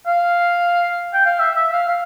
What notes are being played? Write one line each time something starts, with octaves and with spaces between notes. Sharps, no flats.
F5
G5
F5
E5
E5
F5
F5